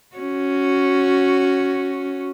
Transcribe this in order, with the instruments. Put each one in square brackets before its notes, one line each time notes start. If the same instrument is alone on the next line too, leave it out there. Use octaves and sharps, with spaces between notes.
[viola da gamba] C#4 F#4